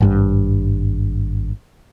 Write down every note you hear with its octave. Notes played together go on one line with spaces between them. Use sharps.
G#1 G2 G3